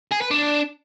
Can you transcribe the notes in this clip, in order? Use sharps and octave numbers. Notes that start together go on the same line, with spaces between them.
G#4
B4
D4